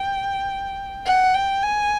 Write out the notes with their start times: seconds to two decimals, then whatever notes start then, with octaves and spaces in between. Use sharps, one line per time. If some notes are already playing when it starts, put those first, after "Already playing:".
Already playing: G5
1.05 F#5
1.34 G5
1.63 G#5